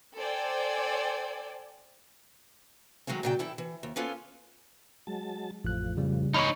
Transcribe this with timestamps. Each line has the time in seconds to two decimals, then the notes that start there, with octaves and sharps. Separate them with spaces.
0.15 A4 C5 D5 G5 G#5
3.07 D#3 F#3 G#3 A3 C#4
3.23 A#2 C#3 F#3 D5 E5 G5
3.39 E3 E4 A4 G5
3.58 E3
3.83 D#2
3.96 A#3 B3 C#4 F4 A4 B4
5.07 F#3 G#3 A5
5.64 A1 F2 A2 F3 F#6
5.97 C#3 G3
6.34 D#4 C#5 G#5 B5 C#6